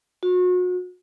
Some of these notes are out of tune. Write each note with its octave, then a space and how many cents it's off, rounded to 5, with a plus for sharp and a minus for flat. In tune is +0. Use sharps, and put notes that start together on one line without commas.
F#4 -35